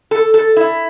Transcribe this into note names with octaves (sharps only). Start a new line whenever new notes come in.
A4
A4
E4